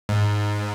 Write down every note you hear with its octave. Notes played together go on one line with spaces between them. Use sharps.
G#2